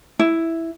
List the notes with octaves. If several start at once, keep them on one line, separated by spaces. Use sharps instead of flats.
E4